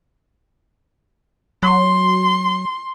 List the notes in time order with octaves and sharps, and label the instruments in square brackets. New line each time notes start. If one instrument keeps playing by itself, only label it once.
[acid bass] F#3 [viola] C6